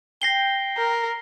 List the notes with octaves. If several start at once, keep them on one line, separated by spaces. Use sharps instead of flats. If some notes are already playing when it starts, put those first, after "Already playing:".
G5 A#6 C7 G7
A#4